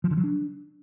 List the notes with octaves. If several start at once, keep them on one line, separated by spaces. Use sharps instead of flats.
F3
D3
F#3
D4